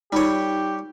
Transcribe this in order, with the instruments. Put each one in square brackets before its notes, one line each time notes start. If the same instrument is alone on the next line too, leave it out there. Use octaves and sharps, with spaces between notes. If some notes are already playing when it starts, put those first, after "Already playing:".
[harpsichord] G3 C#5 [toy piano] D#4 F4 A#4 [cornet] G4